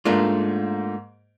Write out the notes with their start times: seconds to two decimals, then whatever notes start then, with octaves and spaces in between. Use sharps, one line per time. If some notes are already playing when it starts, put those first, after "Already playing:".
0.05 G#2 A3 A#3 D4 F4